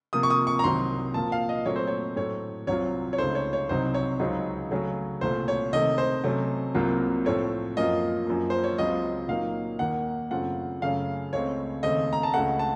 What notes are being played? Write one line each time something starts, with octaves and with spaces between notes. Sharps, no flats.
C3 F3 A#3 F4 D#6
C#6
D#6
C#6
A#5
C2 C3 D#3 F#3 C4 C6
A#2 F3 A#3 F4 A5
F5
D#5
A#2 F#3 A3 C4 C#5
C5
C#5
A2 F#3 A3 C#5
C2 C3 F#3 C4 F4 C#5
C#5
C#2 C#3 A3 D#4 C5
C#5
C#5
C2 C3 F#3 C4 D#4 C5
C#5
C#2 C#3 F#3 C4 D#4
C#3 F#3 A3 C#4
C2 A#2 A3 C5
C#5
C3 D#3 A3 D#5
C5
C3 F#3 A3 C#4
C2 C3 F#3 A#3 F4
A2 F3 A3 C4 C#5
F#2 F3 A#3 F4 D#5
F#2 F3 A#3
C5
C#5
C#2 C#3 F#3 C4 F4 D#5
A#2 F#3 A#3 D#4 F5
D#2 D#3 A#3 F#5
F#2 C#3 A3 C4 F4 F#5
F#2 C#3 A3 C#4 F5
C#2 C#3 A3 C4 C#5
D#2 C#3 A3 C4 D#5
A#5
A5
C#2 C#3 A3 F#5
A5